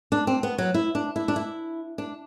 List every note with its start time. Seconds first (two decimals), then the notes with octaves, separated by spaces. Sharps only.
0.12 D4
0.27 C4
0.43 B3
0.58 F#3
0.74 E4
0.95 D4
1.16 E4
1.28 D4
1.36 E4
1.98 D4